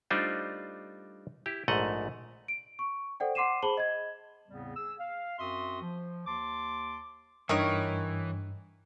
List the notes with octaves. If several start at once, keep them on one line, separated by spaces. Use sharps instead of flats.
G3 A3 D4 D#4 F4 C5
E4 G4
A#1 G#2 A3 D#5 F#5
D7
C#6
A4 C5 D5 F#5 G5
F#5 C6 D6 C7 D#7 E7
G#4 C5 A5 B5 F#7 G7
D#5 G#6
E2 A2 C#3 G3 B3 C4
G#4 E6
F5
F#2 C4 F#4 E5 C6 D#6
F3
D#2 A5 C6 D6
G2 D#3 E3 A#4 C#5 D#6